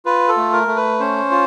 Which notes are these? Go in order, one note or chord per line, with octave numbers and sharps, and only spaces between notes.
F4 B4
A4
A3
A#4
A3
B4
C#4 C5
F4